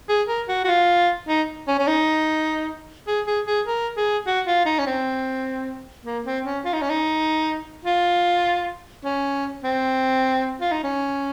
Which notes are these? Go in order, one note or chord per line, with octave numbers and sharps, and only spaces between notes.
G#4
A#4
F#4
F#4
F4
D#4
C#4
C#4
D#4
G#4
G#4
G#4
A#4
G#4
F#4
F4
D#4
C#4
C4
A#3
C4
C#4
F4
D#4
C#4
D#4
F4
C#4
C4
F4
D#4
C#4